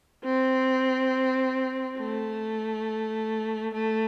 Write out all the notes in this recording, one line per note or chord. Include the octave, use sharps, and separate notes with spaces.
C4
A3
A3